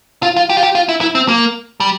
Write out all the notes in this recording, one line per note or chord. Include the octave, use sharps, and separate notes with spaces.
F4
F4
G4
F4
G4
F4
E4
E4
C4
A#3
G3